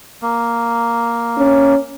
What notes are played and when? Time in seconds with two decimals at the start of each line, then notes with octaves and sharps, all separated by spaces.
0.22 A#3
1.37 C#4